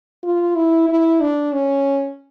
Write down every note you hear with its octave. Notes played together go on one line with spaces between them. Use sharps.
F4
E4
E4
D4
C#4